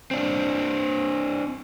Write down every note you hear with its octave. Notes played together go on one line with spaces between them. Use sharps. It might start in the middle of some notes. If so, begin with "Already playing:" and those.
C4 D4